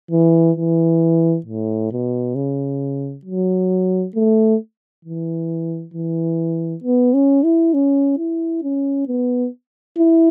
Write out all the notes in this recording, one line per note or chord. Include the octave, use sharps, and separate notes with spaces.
E3
E3
A2
B2
C#3
F#3
A3
E3
E3
B3
C#4
E4
C#4
E4
C#4
B3
E4